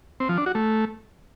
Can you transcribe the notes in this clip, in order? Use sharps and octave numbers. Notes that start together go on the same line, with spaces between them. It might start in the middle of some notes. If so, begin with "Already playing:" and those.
C4
F3
D4
F#4
A3